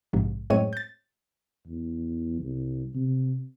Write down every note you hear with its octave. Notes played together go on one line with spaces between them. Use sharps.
A#1 G#2 C3
F#2 A2 G#3 C4 C#5 D#7
G6 A6
E2
C2
C3